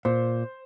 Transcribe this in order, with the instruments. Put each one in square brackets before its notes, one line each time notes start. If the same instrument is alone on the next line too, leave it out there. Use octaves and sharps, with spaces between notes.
[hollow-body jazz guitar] A#2 [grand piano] C5